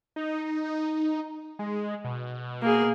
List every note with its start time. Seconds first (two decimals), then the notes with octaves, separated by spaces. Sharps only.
0.16 D#4
1.59 G#3
2.04 B2
2.62 A#3 G#4